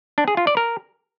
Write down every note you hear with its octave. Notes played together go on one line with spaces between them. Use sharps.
D4
G#4
F4
D5
A#4